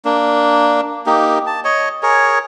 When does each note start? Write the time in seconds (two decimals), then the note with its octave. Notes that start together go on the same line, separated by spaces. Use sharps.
0.05 A#3 D4
1.06 A#3 D#4 G4
1.47 A5
1.64 C#5 D#5
2.03 G#4 A#4 C#5